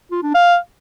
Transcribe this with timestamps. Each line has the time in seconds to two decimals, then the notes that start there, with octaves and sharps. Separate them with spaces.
0.12 F4
0.23 D4
0.34 F5